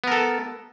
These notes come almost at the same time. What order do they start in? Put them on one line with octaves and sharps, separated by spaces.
B3 A#4 A4